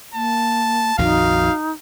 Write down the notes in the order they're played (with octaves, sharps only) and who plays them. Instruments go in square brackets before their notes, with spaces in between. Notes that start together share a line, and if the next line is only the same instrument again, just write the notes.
[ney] A#3 [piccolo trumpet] A5
[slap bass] A#1 F2 D#3 [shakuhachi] D#4 [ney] F#4 [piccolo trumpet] F5